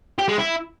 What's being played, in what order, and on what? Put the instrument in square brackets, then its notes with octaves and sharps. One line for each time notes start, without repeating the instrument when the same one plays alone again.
[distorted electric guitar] G4
G#3
E4